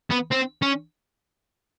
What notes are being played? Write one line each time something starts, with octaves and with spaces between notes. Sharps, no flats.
B3
C4
C#4